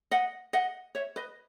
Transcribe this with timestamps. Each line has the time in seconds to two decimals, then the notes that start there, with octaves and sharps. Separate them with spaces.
0.11 D#5 F#5
0.53 D#5 F#5
0.95 C#5 E5
1.16 B4 D#5